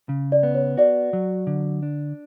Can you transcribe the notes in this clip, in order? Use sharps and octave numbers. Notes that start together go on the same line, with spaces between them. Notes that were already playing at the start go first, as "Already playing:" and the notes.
C#3
D5
B3
C#5
F#4 D5
F#3
D3
D4